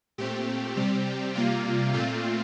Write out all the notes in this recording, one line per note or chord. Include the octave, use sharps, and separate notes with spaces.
A#2 A3 C4 G4
C3 G3 C4
C3 G3 A#3 F4
A#2 A3 C4 F4